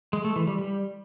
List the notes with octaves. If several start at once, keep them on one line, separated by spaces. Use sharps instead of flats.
G#3
A3
E3
G3
G3